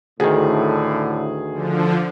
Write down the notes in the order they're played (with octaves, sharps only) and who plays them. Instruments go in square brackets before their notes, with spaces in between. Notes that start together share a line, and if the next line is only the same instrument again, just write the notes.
[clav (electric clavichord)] D2 D#3 [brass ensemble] A2 D3 [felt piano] G#4
[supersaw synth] D3 F3